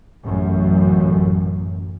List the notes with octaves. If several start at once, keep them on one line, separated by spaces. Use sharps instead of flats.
A1 F#2